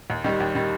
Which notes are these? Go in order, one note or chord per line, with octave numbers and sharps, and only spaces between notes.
D#2
D#3 G3
D#2
D#3 G3